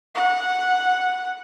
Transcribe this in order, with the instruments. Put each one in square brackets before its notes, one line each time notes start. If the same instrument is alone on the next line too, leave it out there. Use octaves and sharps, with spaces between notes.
[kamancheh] F#5